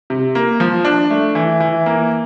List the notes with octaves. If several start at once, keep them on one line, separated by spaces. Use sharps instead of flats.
C3
A#3
F3
D4
A3
E3
E3
A#3